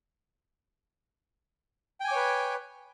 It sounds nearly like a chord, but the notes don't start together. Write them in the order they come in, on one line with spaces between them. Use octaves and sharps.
G5 G#5 D6 C#5 B4